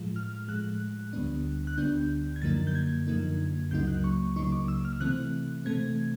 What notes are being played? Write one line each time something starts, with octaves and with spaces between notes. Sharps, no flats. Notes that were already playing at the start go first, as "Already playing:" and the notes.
Already playing: A2 F3 G#3
F6
A2 F3 G#3 F#6
D2 D3 G3 B3 D4
F#6
D2 D3 G3 B3 D4 G6
G#6
F#2 D3 F3 A#3 D#4 A6
G6
G#6
F#2 D3 F3 A#3 D#4
C#2 C#3 F#3 A#3 D#4 G6
F#6
C#6
C#2 C#3 F#3 A#3 D#4 C#6
D6
E6
F6
C3 E3 A3 C4 F#6
C3 E3 A3 C4 G#6